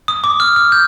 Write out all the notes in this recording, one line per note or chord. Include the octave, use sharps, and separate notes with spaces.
D#6
D6
F6
F6
G6